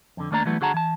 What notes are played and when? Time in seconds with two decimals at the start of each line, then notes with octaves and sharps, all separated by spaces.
0.17 F2 D3
0.31 D#2 A3 A#3 D4 C#5 A#5
0.45 E3 F#3 G3 A3 B3 E4
0.61 D3 F#4 G#4 F#5 A5 A#5
0.74 E3 A5